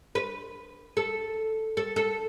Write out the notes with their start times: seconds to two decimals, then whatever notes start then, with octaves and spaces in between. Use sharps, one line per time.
0.15 B4
0.97 A4
1.77 A4
1.96 A4